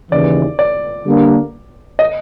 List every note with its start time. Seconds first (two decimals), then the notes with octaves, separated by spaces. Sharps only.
0.11 D#2 C#3 E3 D5
0.59 D5
1.05 D3 G3 A#3 D4
1.99 D#5